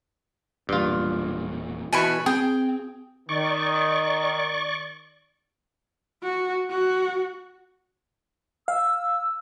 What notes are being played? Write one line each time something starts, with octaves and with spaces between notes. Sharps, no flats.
E1 G2 A#2 F4
B2 E3 B4 G#5 B5 C#6
C4 G#4 G5
D#3 D5 C#6
F#4
F#4
F5 E6